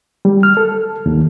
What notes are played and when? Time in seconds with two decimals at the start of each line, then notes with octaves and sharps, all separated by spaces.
0.25 G3
0.43 F6
0.57 A4
1.06 D#2